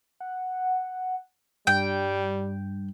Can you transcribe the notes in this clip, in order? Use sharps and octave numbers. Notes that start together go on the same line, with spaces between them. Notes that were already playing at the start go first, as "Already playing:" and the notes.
F#5
G2 G3 G5